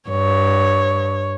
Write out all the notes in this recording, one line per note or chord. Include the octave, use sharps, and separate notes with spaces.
G2 C#5